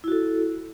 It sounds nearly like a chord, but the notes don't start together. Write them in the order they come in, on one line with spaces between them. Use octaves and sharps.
E4 F#4 A4